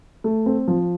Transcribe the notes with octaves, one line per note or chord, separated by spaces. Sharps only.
A3
C4
F3